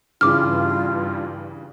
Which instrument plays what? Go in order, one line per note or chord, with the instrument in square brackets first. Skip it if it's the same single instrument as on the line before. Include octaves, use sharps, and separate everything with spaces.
[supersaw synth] G2 [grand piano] C#3 E3 [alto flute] F4 [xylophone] D6 F6